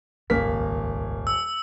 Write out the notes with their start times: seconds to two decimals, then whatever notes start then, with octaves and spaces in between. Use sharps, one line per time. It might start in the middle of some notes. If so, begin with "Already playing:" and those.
0.30 D#1 G#1 C#2 A#3 F6 B6
1.27 E6